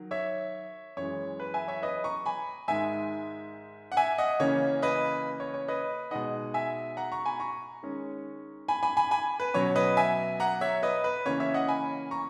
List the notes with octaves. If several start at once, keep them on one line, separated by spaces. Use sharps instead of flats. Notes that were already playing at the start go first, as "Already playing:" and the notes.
Already playing: D#3 F#3
C#5 E5
F#2 E3 G#3 C#5
B4
E5 G#5
C#5 E5
B4 D#5
A#5 C#6
G#5 B5
G#2 D#3 G#3 E5 G#5
F#5
E5 G#5
D#5 F#5
C#3 E3 A#3 C#4 C#5
B4 D#5
C#5
C#5
B4 D#5
B2 G#3 D#4 D#5 F#5
E5 G#5
F#5 A#5
A#5 C#6
G#5 B5
A#5 C#6
D#3 G#3 C#4
G#5 B5
G#5 B5
G#5 B5
G#5 B5
B4
B2 F#3 C#4 C#5
B4 D#5
E5 G#5
F#5 A#5
C#5 E5
B4 D#5
B4
C#3 E3 A#3 C#4 C#5
C#5 E5
D#5 F#5
G#5 B5
A#5 C#6